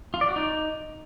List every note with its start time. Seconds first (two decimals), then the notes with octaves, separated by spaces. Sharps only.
0.14 F4
0.21 D5
0.29 F#4
0.36 D#4